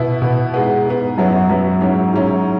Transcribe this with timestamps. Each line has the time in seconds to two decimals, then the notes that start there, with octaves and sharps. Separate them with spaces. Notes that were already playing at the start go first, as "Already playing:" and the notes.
Already playing: B2 B3 E4
0.22 B2 B3 E4
0.54 G#2 G#3 B3
0.86 G#2 G#3 B3
1.18 F#2 F#3 B3 E4
1.49 F#2 F#3 B3 E4
1.81 G#2 F#3 C#4 E4
2.13 G#2 F#3 C#4 E4